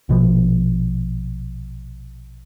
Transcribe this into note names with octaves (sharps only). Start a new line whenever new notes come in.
A#1 B2 F3